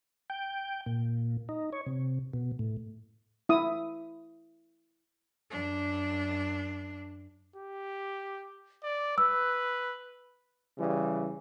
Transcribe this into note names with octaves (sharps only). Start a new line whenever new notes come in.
G5
A#2
D#4
C#5
C3
B2
A2
E4 D#6
F#2 D4
G4
D5
B4 E6
C#3 E3 G3